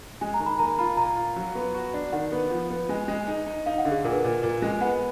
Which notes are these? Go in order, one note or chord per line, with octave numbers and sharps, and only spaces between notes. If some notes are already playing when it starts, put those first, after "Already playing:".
G#3 G#5
A#5
D#3
B5
A#3 A#5
F4 B5
A#2 A#5
F4
F#3
B3
F#4
D4
D#3 F#5
B3
F3
B3
G#3
G#3
D#4
D#4
D#4 F5
F#5
D3
G#4
A#2 A#4
B4
A#2 A#4
A#2
G#3
B3 F#5